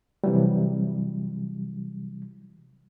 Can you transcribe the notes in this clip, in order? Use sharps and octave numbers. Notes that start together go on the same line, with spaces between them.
C3 E3 F#3 G3